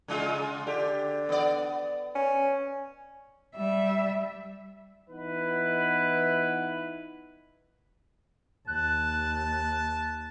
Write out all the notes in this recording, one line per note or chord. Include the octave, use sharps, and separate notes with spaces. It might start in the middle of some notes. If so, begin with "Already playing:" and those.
C#3 G#3 F4
D3 G4
B3 D5
C#4
G3 E5
E3 B3 D#4 E4 B4
D#2 A5 F#6